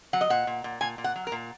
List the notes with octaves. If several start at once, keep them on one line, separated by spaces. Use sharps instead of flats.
F#3 F#5
D#5
A#2 F#5
A#2
A#2
A#2 G#5
A#2
F#5
F#3
A#4
A#2